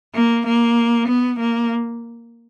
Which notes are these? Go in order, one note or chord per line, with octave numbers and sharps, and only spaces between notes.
A#3
A#3
B3
A#3